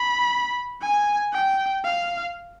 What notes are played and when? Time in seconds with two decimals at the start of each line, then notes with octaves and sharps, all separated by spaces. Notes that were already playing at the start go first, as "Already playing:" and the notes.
Already playing: B5
0.81 G#5
1.33 G5
1.84 F5